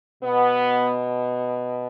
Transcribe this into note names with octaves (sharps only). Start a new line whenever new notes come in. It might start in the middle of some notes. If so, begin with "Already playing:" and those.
B2 B3